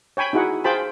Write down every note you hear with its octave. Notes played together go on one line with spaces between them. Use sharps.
C#5 G5 G#5 B5
D#4 E4 F#4 G#4 F#5
F4 G#4 C5 G5 A5 B5